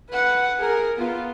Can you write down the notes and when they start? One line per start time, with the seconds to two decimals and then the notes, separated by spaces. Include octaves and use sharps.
0.10 B4 F#5
0.58 G#4 A#4
0.98 B3 F4